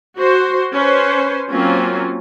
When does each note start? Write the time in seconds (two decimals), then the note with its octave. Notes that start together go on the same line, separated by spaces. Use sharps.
0.18 F#4 C5
0.73 C#4 B4 C5
1.49 F#3 A#3 C4 C#4 F4